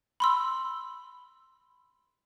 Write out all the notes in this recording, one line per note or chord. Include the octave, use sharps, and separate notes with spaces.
B5 C6 E6